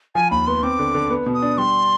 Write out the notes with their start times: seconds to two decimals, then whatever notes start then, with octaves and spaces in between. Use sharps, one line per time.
0.15 F3 G#5
0.31 D#2 B5
0.47 B3 C6
0.63 C4 D6
0.79 D3
0.94 D3
1.10 B3
1.26 B2
1.34 D#6
1.42 D4
1.58 G3 C6